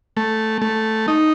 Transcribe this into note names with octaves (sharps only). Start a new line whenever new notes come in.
A3
A3
D#4